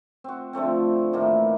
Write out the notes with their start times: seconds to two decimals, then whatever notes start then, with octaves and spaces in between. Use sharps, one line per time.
0.24 C4 F#4
0.53 D3 F3 A3 C4
1.13 A2 D#3 E3 A#3